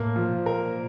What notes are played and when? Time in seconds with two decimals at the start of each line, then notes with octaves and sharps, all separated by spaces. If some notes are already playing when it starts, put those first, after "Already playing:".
Already playing: A2 A#3
0.16 F3
0.31 A#2
0.46 A#4